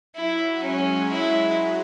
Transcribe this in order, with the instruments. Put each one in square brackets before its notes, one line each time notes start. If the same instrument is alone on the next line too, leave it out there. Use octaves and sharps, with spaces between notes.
[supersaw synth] F#3 [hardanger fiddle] E4
[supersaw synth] G#3 [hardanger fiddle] C#4
[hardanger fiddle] E4